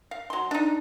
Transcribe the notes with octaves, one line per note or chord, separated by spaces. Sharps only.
F5
F#3 C6
D4 D#4